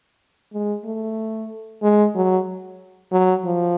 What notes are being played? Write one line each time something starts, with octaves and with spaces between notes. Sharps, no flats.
G#3
A3
G#3
F#3
F#3
F3